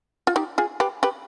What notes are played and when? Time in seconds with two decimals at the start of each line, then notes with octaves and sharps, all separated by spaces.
0.27 F4
0.36 D#4 G4
0.58 F4 G#4
0.80 G4 B4
1.03 G4 B4